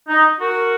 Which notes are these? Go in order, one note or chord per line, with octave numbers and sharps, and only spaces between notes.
D#4
F#4 A#4